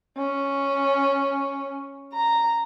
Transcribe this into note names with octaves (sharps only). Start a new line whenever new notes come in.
C#4
A#5